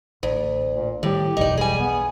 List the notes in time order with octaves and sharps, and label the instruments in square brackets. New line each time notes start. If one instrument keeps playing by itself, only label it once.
[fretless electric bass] A1 [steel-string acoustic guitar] D2
[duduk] A#2
[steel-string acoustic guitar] A2 [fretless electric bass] D#3 G3 [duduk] G4
[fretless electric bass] F#1 B1 E2 [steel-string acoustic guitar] D#4 D5
[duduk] G3 [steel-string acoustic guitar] G#4 G#5
[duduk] B3